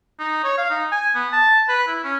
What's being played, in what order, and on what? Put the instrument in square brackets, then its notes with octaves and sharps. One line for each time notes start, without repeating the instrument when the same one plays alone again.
[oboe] D#4
C#5
F5
D#4
G#5
B3
A5
B4
E4
C#4